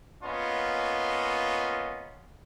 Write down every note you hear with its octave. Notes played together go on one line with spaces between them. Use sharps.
A#3 B3 C#4 F4 D#5